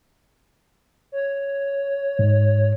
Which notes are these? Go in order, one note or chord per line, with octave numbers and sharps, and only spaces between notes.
C#5
G#2